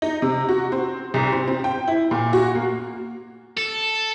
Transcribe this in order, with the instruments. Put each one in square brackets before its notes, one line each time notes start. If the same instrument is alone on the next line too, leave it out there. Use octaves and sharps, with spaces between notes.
[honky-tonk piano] D#4
C3
F#4
C4
C2
C4
C4
G5
E4
A#2
F#4
A#3
[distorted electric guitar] A4